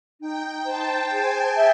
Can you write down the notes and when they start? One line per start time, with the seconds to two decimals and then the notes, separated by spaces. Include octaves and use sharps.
0.21 D#4 G5
0.66 C5 A5
1.11 G#4 G#5
1.56 E5